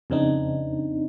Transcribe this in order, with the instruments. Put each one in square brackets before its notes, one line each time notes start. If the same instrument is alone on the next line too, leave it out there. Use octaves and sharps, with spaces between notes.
[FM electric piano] F2 C#3 C4 D4 D#4